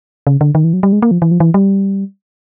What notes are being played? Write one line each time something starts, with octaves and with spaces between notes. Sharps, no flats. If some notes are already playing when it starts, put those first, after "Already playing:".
C#3
D3
D#3
E3
F#3
G3
G#3
A#3
F3
E3
F3
E3
G3